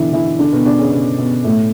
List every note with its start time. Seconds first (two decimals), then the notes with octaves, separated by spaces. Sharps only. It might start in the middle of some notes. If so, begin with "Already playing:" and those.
Already playing: B2 D3 E3 D4 E4
0.13 E3 E4
0.39 D3 D4
0.53 B2 B3
0.66 D3 D4
0.78 C#3 C#4
0.92 B2 B3
1.18 B2 B3
1.44 A2 A3